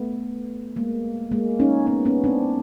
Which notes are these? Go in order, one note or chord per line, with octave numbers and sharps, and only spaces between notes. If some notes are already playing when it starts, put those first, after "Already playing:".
Already playing: A3 B3
G#3 A#3
G#3 A#3
C#4 D#4
B3 C#4
B3 C#4
C4 D4